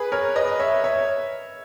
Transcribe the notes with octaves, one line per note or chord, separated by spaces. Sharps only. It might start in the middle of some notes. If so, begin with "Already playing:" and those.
Already playing: G#4 B4
A#4 C#5
B4 D#5
C#5 E5
C#5 E5